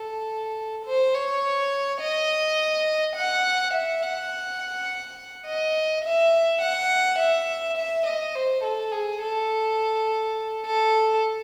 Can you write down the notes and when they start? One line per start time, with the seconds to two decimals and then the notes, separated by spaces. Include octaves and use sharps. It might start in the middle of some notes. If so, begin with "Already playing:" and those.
Already playing: A4
0.86 C5
1.15 C#5
2.01 D#5
3.16 F#5
3.74 E5
4.02 F#5
5.47 D#5
6.05 E5
6.62 F#5
7.19 E5
7.77 E5
8.07 D#5
8.35 C5
8.64 A4
8.92 G#4
9.22 A4
10.66 A4